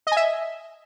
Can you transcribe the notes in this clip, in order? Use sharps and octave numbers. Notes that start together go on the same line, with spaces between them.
D#5 E5 G#5